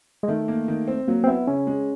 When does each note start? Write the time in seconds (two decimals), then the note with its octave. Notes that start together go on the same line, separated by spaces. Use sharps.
0.23 G#3
0.28 D#3 A3
0.48 A#3
0.68 D#3
0.88 C4
1.08 F#3 A#3
1.24 C4
1.27 B3 E4
1.47 C#3 C#4
1.67 G#3